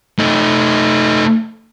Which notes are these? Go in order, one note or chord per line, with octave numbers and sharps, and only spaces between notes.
A3 D#4